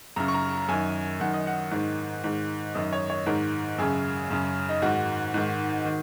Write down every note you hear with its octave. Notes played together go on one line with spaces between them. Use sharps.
F#2 C#3 A#5
C#6
A#5
F#2 D#3 G#5
F#2 D#3 F#5
D#5
F#5
G#2 D#3
G#2 D#3
F#2 D#3 D#5
C#5
C#5
G#2 D#3 A#4
F#2 C#3 G#4
F#2 C#3
D#4
G#2 D#3 F#4
G#2 D#3
D#3